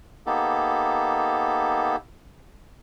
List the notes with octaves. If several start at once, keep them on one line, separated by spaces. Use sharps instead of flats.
A#3 B3 D#4 G4 A4